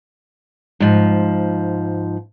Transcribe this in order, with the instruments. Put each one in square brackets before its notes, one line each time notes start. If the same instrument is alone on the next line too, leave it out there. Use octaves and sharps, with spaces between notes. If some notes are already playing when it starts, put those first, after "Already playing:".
[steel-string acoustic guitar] G#2 F3